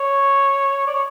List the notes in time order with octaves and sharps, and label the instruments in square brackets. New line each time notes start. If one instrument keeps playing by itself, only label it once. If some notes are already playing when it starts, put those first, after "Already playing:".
Already playing: [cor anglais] C#5
D5
C#5